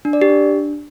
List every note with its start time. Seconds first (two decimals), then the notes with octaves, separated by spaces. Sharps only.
0.05 D4
0.13 D5
0.21 G4
0.30 D4